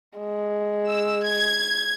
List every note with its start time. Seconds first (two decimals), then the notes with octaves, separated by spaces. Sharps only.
0.18 G#3
0.88 E6
1.24 G#6